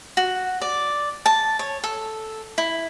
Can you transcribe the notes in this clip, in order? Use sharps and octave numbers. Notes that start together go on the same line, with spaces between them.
F#4
D5
A5
C#5
A4
E4